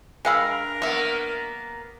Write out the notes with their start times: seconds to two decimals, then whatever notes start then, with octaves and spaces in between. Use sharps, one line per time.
0.25 G#3 D4 A#4 F5 G5 G#5 B5 E6
0.82 A#3 B3 E5 C#6